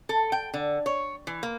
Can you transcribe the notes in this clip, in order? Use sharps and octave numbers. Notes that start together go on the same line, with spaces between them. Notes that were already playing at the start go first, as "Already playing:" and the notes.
A4
G5
D3
C#5
E3
A#3